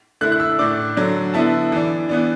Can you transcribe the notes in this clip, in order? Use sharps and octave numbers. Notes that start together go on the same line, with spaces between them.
D3 A3 E4 F#6
F#6
E6
A2 A3 D4 D6
D3 F#3 D4
D3 B3 E4 A5
E3 D4
E3 B3 D4